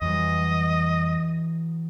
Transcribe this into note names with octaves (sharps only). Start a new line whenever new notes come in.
F2 E3 F#3 G3 D#5